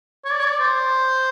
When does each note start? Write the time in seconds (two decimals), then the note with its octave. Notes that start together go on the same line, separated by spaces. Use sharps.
0.25 C#5
0.33 D5
0.40 C#5
0.45 D5
0.60 C5